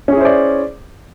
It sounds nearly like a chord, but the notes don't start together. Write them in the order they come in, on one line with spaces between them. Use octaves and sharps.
C#4 G#4 E4 C5 D5